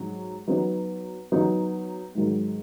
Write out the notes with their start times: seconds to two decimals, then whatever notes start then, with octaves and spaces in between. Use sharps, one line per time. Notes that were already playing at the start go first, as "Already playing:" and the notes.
Already playing: G#2 F#3 D#4
0.48 F#3 B3 D#4
1.32 F#3 B3 D#4
2.15 G#2 D#3 F#3